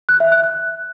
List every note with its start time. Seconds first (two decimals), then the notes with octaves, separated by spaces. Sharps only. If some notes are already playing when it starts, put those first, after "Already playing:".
0.09 F#6
0.20 E5
0.32 F#6
0.44 F#6